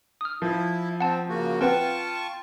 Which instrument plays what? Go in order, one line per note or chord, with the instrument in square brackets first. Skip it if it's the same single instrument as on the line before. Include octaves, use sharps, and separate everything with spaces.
[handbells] D#6 F6
[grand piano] F3 [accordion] E4
[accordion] C4 [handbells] F#5 A5
[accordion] C#3 A#3 F#4
[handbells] C4 B4 F#5 [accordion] F4 A5 C#6 [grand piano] G5